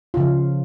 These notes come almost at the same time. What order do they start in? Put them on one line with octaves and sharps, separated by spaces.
F4 C#3 F3